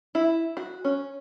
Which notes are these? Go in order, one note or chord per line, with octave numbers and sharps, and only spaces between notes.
E4
F#4
C#4